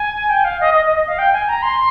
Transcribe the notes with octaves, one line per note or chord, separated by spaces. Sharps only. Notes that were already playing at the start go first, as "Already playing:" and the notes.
Already playing: G#5
G5
F5
D#5
D#5
D#5
D#5
F5
G5
G#5
A#5
C6